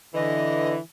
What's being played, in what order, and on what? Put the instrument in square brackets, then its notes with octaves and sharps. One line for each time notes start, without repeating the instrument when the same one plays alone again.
[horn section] D3 E3 [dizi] D#5